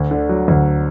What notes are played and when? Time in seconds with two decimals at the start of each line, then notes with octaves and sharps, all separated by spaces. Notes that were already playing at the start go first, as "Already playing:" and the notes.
Already playing: D2
0.11 D3
0.29 F#3
0.48 D2